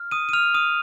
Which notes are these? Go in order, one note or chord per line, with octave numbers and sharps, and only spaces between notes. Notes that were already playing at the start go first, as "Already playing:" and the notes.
Already playing: F6
D#6 D#7
D#7
F6 F7
D#6 D#7